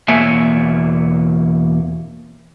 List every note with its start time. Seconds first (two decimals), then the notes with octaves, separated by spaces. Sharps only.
0.08 E2 B2 A#3 C#5 E5 G#5